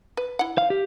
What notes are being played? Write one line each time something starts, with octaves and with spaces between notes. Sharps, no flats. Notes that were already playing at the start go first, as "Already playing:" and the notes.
B4
E4 F#5
F5
G4